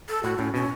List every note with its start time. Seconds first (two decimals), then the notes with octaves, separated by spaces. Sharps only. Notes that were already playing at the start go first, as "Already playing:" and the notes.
0.09 A4
0.23 A2 F#4
0.39 A2 C#4
0.54 B2 C#4